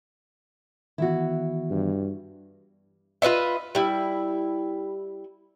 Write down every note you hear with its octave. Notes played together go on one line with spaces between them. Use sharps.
D#3 E3 B3 E4 F#4
G2
F4 B4 D#5 E5
G3 E4